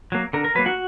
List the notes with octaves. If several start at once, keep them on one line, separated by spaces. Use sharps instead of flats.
F#3 A#3
D3 A#4
A#4
F#3 A#3 B4
F#4